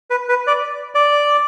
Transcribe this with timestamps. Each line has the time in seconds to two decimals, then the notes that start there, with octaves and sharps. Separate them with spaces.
0.10 B4
0.29 B4
0.47 D5
0.95 D5